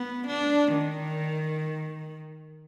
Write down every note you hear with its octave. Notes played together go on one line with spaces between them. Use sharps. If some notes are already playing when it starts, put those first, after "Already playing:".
Already playing: B3
D4
D#3